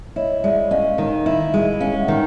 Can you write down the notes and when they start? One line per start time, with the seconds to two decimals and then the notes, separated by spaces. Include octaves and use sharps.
0.16 E4 C#5 D#5
0.44 G#3 D5 E5
0.71 C#4 D#5 F5
0.98 D#3
1.26 E4
1.54 G#3
1.80 C#4 D#5 F5
1.99 E5 F#5
2.08 D#3